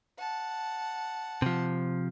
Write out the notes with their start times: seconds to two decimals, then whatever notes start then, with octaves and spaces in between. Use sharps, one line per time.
0.18 F#5 A5
1.42 C3 F3